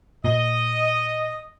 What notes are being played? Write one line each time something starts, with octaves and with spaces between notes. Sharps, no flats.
A#2 D#5